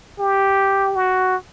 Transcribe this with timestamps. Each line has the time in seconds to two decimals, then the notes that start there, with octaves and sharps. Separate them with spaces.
0.19 G4
0.96 F#4